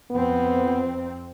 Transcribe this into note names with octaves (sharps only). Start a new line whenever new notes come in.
F2 B3 C4